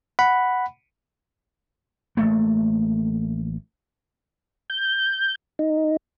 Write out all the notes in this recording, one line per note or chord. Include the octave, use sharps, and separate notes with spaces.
F#5 B5
A1 A3 A#3
G6
D#4